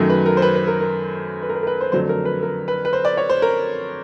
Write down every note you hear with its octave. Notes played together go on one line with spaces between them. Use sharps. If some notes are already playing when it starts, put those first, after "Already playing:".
Already playing: F#2 D#3 F#3 A3
B4
A#4
C5
B4
B4
A#4
A#4
B4
A#4
B4
A#4
B4
C5
F2 D3 F#3 A3 C5
A#4
B4
A#4
B4
B4
C5
D5
C#5
C5
A#4